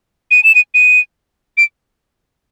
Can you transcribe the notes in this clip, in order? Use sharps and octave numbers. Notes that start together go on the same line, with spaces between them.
D#7
E7
D#7
D#7
D7